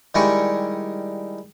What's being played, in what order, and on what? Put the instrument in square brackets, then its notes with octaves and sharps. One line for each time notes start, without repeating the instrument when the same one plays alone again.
[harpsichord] D#3 G3 G#3 E4 G#5 C#6